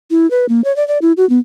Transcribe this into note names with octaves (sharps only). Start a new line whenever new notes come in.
E4
B4
A#3
C#5
D5
D5
E4
F#4
B3